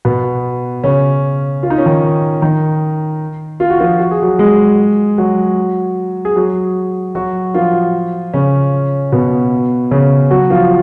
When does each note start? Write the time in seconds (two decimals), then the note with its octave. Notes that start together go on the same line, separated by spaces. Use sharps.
0.05 B2 B3
0.84 C#3 C#4
1.63 F4
1.70 D#4
1.78 C#4
1.86 D#3 D#4
2.42 D#3 D#4
3.60 F4
3.70 F#4
3.80 F3 F4
4.00 F#4
4.11 G#4
4.22 F#3 F#4
4.39 G#3 G#4
5.18 F#3 F#4
6.25 G#4
6.36 F#3 F#4
7.15 F#3 F#4
7.54 F3 F4
8.34 C#3 C#4
9.12 B2 B3
9.91 C#3 C#4
10.31 F#3 F#4
10.50 F3 F4